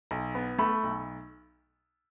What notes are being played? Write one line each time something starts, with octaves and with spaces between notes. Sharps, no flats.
B1
B3
A3 B5
B1